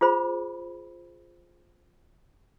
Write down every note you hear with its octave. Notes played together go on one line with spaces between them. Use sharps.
F4 G#4 C5 B5